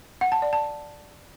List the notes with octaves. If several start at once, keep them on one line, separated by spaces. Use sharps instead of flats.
F#5
A5
D5
A5